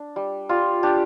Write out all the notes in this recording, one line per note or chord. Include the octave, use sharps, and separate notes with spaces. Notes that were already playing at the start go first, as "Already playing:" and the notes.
Already playing: D4
G3
G3 F4
D4 G4